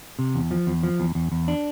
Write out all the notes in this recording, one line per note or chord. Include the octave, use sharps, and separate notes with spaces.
C3
E2
F3
E2
F3
E2
E2
E2
D4